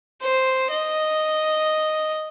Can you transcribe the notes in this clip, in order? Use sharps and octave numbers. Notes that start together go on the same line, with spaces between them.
C5
D#5